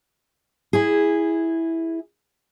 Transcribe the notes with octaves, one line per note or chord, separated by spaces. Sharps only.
E4 G#4